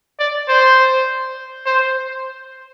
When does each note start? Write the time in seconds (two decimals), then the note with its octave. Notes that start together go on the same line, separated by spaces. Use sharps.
0.19 D5
0.49 C5
1.66 C5